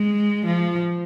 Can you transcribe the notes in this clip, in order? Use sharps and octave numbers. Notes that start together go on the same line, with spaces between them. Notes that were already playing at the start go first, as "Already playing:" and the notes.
Already playing: G#3
F3